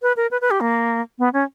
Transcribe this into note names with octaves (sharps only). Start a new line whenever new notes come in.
B4
A#4
B4
B4
G4
A#3
B3
C#4